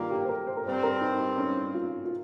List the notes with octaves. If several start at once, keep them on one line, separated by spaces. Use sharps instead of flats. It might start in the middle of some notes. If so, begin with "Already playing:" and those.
Already playing: G2 D#3 G3 A#3 F4
G4
C5
A#4
C5
A#4
G2 G3 C4 C5
A#4
D#4
D#4
C#4
F4
F4